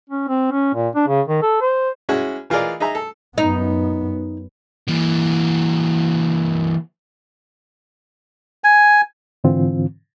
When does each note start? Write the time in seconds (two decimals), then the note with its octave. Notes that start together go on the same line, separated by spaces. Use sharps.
0.09 C#4
0.28 C4
0.51 C#4
0.74 A#2
0.95 D4
1.07 C#3
1.27 D#3
1.42 A4
1.61 C5
2.09 G#3 C#4 E4 F#4 G#4
2.50 E3 F4 G#4 A#4 D5 D#5
2.80 D#4 G#4 E5 A#5
2.95 A4
3.38 F#2 B3 D#4
4.88 E3 A#3
8.64 G#5
9.44 G#2 D3 E3 C4 F4